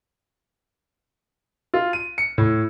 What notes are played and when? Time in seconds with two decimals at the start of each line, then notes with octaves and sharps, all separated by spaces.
1.74 F4
1.93 D#7
2.18 C#7
2.38 A2